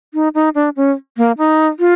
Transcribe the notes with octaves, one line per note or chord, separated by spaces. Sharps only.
D#4
D#4
D4
C#4
A#3
D#4
F4